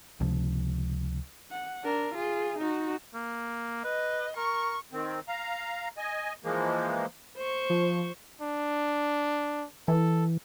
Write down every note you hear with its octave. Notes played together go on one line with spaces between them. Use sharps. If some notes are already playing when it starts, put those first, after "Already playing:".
C#2 C3 F3
F#5
D4 A#4
F4 G#4
D#4 F#4
A#3
B4 D#5
A#4 C#6
D#3 C4
F5 A#5
D#5 G#5
E3 F3 G#3 A#3
C5 C#6
F3
D4
E3 A4